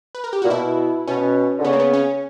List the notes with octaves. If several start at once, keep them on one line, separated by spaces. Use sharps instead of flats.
B4
A#4
G4
A#2 F#4
B2 E4
B2 C#4
D3
C#3 B3
A#3
B3
C#4